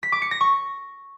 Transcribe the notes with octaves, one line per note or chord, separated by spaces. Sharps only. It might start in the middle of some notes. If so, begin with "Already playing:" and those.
B6
D6
C#7
A#6
C#6